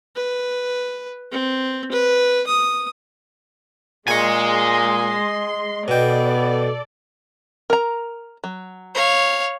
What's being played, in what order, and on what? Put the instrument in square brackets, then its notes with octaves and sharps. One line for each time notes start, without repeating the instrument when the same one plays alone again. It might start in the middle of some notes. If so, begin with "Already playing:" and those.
[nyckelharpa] B4
C4
B4
D#6
[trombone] A#2 [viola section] G#3 C6 [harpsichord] G#4 C#6 [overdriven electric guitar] D#5 G#5
[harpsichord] B2 G5 [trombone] B3 [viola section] A4 D5
[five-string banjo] A#4 A#5
F#3
[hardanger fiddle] C#5 F5